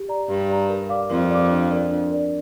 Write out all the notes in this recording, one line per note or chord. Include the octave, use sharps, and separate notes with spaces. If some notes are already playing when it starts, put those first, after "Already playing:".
Already playing: G4
D5 A#5
G2 G4
D5 A#5
A#4
D5 F5 D6
F2 A#4
D5 F5 D6
D4
A#4 D5
D4
A#4 D5